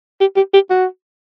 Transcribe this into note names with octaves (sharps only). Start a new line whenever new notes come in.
G4
G4
G4
F#4